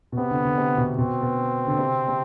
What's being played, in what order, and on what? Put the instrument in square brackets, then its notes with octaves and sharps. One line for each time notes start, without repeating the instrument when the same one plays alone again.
[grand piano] B2
[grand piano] C3 [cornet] B3
[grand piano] D3
D3
C3
B2
[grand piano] B2 [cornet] C4
[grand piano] B2
D3
C3
C3